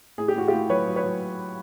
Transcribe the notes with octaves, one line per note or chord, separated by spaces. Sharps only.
A2 G#4
G4
A2 F#4
F4 G4
A2
F#3 B4 C#5
F#3
B4 C#5
F#3